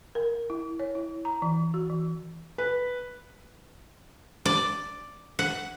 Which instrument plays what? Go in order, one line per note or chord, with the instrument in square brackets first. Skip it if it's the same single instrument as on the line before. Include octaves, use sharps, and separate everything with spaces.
[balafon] A#4
E4
C#5
E4
A#5
E3
F#4
E3
[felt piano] B4
[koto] D5
F#5